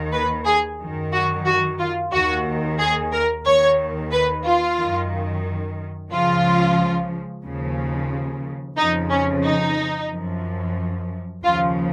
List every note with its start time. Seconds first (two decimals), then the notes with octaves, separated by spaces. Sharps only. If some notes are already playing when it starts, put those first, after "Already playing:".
Already playing: D#2 D#3
0.12 B4
0.45 G#4
0.79 F#2 D#3
1.12 F#4
1.46 F#4
1.79 F4
2.11 D#2 D#3 F#4
2.78 G#4
3.12 A#4
3.45 D#2 D#3 C#5
4.11 B4
4.44 F4
4.78 F#2 D#3
6.11 C#2 C#3 F3 F4
7.44 D#2 C#3 F3
8.77 F2 C#3 F3 D#4
9.10 C#4
9.43 D#4
10.10 F#2 F3
11.43 D#2 C#3 F3 F4